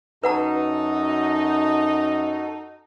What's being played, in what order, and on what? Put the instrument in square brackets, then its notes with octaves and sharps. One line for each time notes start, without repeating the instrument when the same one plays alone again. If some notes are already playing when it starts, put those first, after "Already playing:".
[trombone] F#2 [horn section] D#4 [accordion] F#4 A4 [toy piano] B4 F#5 A#5